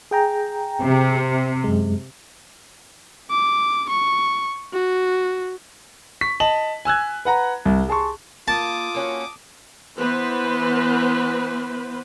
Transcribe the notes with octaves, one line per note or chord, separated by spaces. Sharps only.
G#4 G5 A#5
C3
F#2 G#3
D6
C#6
F#4
C#6 B6
D#5 A5 F#7
G#5 E6 F#6 G#6
B4 F#5 A#5
C2
G#4 A5 C6 C#6
A#3 F4 A5 D6 D#6
A#3 C#4 F#4
E3 B3 B4 C5